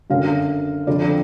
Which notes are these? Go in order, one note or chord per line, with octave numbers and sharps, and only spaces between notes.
F#2 D3 F#3 F5
F2 D3 F3 D5